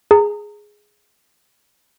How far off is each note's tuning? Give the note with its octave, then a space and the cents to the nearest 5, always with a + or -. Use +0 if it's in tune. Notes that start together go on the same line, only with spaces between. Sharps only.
G#4 +0 A#5 -25